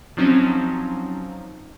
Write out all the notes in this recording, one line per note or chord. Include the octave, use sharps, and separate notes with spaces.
F3 F#3 C4 C#4 D#4